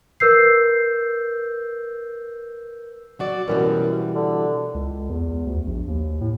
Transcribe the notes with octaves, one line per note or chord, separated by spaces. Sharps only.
A#4 B4 E6 G6 C7
F#3 F#4 D5
F#2 B2 E3 G3
D3
C#2
E2
D2
A#1
D#2
A2